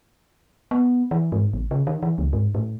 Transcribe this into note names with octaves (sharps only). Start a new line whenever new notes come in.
B3
E3
G#2
A1
C#3
D#3
E3
C#2
G#2
A2